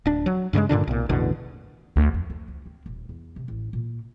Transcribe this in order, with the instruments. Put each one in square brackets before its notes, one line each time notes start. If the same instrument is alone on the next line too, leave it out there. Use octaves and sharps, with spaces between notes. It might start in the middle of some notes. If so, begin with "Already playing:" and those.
[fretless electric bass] D1 D4
F#3
G2 C#3 G3 G#3
G2 A#2 D3 D4
B1 A#2
A1 E2 B2 D3
[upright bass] D2
F2
F2
C#2
C4
D#1
E2
C3
A1
A#2